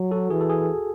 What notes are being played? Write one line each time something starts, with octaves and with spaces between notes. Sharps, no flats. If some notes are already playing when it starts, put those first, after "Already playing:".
Already playing: F#3
F#4 A4
E3 G#4
A4
G#4